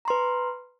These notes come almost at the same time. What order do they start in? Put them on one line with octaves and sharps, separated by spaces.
A#5 C6 B4